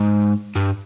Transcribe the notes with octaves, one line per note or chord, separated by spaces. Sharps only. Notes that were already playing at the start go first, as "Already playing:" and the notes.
Already playing: G#2
G2